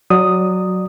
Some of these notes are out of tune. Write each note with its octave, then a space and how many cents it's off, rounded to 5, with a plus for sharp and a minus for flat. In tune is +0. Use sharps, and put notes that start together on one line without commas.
F#3 +0 D5 +20 D#6 +0